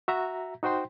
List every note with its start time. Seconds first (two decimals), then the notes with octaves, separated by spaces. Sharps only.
0.08 F#4 E5 A#5
0.63 D#4 F#4 C5 G5 C6